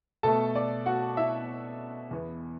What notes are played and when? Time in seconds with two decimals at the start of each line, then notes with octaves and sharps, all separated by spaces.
0.23 B2 A3 A4 A5
0.55 D5
0.86 F#4 F#5
1.17 E4 E5
2.11 E2 E3 B3